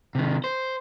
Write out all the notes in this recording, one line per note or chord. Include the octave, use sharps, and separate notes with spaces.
C3 D#3
C5